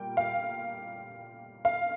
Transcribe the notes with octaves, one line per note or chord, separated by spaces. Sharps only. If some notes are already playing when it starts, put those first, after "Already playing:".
Already playing: A#2 G3 A#3 G5
F5
F5